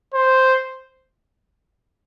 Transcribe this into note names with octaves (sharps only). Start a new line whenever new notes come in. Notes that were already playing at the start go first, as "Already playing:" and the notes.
C5